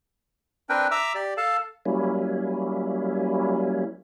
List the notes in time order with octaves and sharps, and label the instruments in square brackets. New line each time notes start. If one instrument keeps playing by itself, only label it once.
[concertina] C4 D4 A#4 B4 G5
E5 A#5 D6 E6
G4 D5
A4 F5 A5
[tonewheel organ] F#3 G3 A#3 C#4 E4